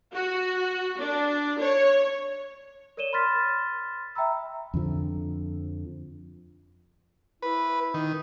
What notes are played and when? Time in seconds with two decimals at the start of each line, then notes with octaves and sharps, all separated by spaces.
0.14 F#4
1.00 D4
1.60 C#5
2.97 A#4 C#5 D5 D#7 E7 G7
3.13 B5 C6 F6 A6 B6
4.15 E5 G5 A#5 B5 E6
4.74 F2 D3 F3
7.42 E4 B4
7.94 D#3